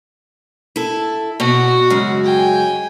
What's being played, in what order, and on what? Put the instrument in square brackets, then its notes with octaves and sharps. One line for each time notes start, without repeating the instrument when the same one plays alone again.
[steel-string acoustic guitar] E4 A4
[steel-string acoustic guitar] B2 [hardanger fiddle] F#4
[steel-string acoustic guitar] F#2 C#3 G#3
[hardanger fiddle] G5 G#5